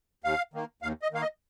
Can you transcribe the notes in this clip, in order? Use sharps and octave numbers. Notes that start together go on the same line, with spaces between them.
D#2 F5
D#3 A#3
D#2 F5
D#5
D#3 A#3 F5
D#5